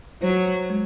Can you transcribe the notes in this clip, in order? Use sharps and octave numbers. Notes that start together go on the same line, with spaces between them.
F#3 C5
G#3